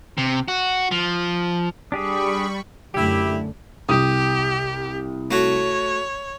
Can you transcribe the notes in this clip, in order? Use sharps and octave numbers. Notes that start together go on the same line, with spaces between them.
C3
F#4
F3
G3 D4 G4 G#4 B5 C#6
F#2 D3 A3 E4 G4
C2 G4 D#6
A3 F#4 C#5